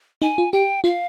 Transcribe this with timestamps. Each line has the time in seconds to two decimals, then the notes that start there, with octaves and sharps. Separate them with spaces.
0.22 D#4 G#5
0.38 F4
0.53 G4 G5
0.84 F4 F5